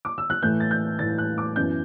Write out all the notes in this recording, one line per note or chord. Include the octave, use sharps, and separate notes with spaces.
D6
E6
F#6
A2 E3 A3 G6
A6
G6
A2 E3 A3 A6
F#6
D6
F#2 E3 B3 G6